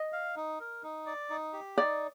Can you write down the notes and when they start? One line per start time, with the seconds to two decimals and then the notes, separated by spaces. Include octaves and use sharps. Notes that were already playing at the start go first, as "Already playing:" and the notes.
Already playing: D#5
0.13 F5
0.36 D#4
0.60 A#4
0.83 D#4
1.06 D5
1.30 D#4
1.53 G4
1.77 D#4 D5